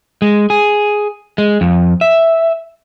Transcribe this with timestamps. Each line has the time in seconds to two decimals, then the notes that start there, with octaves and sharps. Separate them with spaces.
0.22 G#3
0.50 G#4
1.38 G#3
1.61 F2
2.01 E5